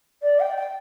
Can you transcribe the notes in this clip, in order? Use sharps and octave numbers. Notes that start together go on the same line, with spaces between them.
D5
G5
G5